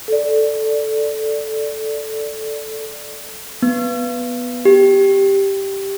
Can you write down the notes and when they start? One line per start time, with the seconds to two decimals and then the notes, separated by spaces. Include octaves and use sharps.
0.08 A4 D5
3.62 B3
4.65 G4